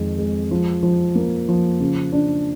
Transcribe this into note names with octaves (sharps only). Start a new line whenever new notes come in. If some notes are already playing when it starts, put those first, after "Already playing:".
Already playing: F2 D#3 G#3
G#3
F3
F3
A#3
F3
C#3
D4